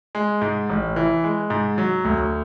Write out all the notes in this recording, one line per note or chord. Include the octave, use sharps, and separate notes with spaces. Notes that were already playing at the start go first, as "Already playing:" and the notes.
G#3
G#2
A1
E3
G#3
G#2
F#3
D2